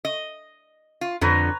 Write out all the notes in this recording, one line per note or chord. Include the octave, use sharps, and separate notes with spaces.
D#5
F4
F2 D3 F3 B4 C#5 A#5